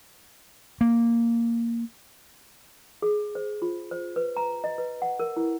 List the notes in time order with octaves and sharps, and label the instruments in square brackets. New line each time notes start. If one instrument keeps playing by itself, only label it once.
[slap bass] A#3
[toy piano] G#4
C5
F4
C5
B4
A#5
D#5
B4
F#5
A#4
E4